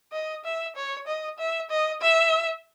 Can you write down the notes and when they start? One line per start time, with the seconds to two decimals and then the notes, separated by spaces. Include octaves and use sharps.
0.13 D#5
0.44 E5
0.75 C#5
1.07 D#5
1.38 E5
1.70 D#5
2.01 E5